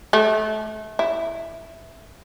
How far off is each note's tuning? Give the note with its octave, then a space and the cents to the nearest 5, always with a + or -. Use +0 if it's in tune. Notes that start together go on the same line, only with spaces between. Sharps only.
A3 -30
E4 +0